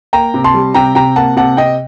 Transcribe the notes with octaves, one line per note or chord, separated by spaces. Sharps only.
A#3 G5 A#5
C3
A5 C6
G3
C3 G5 A#5
C3 G5 A#5
A#3 F#5 A5
C3 F#5 A5
C3 D#5 G5